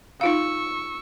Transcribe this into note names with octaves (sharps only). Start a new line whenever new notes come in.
D#4 F4 F5 C#6 E6